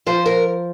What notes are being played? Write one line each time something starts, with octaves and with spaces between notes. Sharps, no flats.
F3 C5
A#4